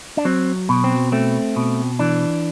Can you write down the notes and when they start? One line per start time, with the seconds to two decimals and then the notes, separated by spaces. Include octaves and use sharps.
0.17 D4
0.25 F#3 C4
0.69 B2
0.84 C4
1.12 A3 C4
1.56 B2
1.99 E3 D4